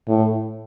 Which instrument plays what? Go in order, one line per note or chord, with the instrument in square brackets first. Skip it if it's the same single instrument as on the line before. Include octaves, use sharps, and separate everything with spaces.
[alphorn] A2